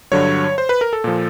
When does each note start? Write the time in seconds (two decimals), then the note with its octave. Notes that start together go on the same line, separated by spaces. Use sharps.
0.12 G2 D3 F#3 C#5
0.58 C5
0.69 B4
0.81 A#4
0.93 A4
1.04 A#2 F3